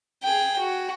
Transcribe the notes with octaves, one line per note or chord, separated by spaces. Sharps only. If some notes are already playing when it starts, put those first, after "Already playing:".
G#4 G5
F#4